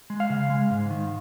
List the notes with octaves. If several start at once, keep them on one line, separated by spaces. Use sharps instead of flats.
G#3
F5
C#3
G#3
G#2
D#3